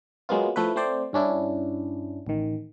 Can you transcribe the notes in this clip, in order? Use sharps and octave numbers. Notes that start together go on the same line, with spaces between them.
F#3 G#3 A#3 B3 F4
F3 A3 E4 B4
A3 C4 C5 D5
G2 C#4 D4 E4
A1 D#3